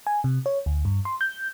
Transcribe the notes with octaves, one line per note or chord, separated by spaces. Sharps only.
G#5
C3
C#5
D2
G2
C6
G6